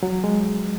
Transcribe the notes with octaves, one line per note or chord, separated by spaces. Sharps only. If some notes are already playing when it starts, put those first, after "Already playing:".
F#3
G#3